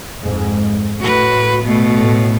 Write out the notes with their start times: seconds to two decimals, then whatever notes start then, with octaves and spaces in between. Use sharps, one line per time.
0.21 F2 G#2 G#3
1.00 A2 F#4 B4
1.64 B2 A3
1.98 A2